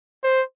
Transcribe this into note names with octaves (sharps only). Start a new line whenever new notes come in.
C5